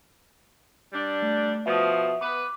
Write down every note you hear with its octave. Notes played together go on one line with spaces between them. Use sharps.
G3 D4
A3
B2 F3 E5 D#6
B3 B4 D6